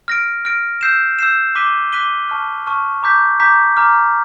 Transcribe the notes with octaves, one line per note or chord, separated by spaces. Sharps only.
F6 A#6 D7
F6 A#6 D7
E6 G6 C7 E7
E6 G6 C7 E7
D6 F#6 B6 D#7 G7
D6 F#6 B6 D#7 G7
A5 C#6 F6
A5 C#6 F6
A#5 D6 G6 B6
A#5 D6 G6 B6
A#5 D6 F6